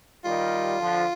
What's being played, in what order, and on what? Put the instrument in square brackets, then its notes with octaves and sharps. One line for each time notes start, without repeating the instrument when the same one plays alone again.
[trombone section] D#3 G3 [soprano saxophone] F4
[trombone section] D3 F3